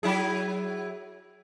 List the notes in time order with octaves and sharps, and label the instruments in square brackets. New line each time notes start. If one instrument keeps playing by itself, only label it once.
[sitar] F#3 E4 G#4